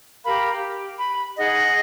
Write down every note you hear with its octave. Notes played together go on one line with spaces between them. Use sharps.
G4 A#4 F5 B5
G4
B5
D#4 G#4 D#5 F#5